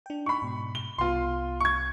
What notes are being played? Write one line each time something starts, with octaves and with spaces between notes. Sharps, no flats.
D4 G5
D#4 B5 C#6
G#2 B2
G7
C2 B3 F4 C6
C#6 G#6